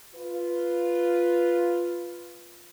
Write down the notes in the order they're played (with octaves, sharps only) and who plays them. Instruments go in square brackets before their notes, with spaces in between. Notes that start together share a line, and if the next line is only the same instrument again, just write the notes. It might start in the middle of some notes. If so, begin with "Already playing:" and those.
[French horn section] F4 B4